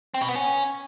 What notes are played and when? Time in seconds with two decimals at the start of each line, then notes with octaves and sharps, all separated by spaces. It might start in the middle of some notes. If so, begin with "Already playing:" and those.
0.14 C4
0.21 B2
0.29 B3
0.36 C#4